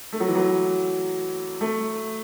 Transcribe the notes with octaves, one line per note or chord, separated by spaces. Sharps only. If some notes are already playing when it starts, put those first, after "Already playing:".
A3
F#3
E3
F#3
A3